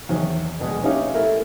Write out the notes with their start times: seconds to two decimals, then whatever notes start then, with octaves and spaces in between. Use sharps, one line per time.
0.09 E2 D#3 F#3
0.59 A#1 B2 G#3
0.84 C#4 D#4 G4 E5 F5
1.14 A3 E4 A#4